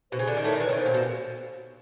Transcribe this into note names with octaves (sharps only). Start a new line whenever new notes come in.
B2 C5
C#3
D3 D5
D#3
A2 A3 C#5
D#3
D5
E3
D#3 C#5
D3 C5
A#2
B2